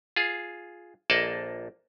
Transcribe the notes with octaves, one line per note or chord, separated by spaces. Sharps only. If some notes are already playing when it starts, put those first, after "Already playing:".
F4 G#4
A#1 A#3 A4 D5 D#5 A5